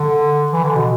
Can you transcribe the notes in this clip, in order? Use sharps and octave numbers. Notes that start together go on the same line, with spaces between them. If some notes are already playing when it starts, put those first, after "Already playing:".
Already playing: D3
E3
D3
B2